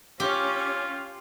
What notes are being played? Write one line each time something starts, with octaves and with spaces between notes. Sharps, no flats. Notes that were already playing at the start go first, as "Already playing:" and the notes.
C#4 F4 G4